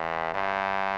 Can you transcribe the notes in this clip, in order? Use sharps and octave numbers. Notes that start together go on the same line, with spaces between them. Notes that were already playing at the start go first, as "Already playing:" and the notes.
Already playing: E2
G2